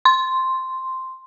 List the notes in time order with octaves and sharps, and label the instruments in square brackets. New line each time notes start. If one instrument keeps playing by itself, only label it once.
[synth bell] C6